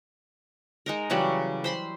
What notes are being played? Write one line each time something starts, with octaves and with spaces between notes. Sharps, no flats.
G#3 D#4 A#4
C#3 E3 F#3 G3
C5 B5 C6